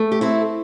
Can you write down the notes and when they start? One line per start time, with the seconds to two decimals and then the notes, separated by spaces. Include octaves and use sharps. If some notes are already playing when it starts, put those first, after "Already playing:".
Already playing: A3
0.12 G4
0.21 C4 E4 A4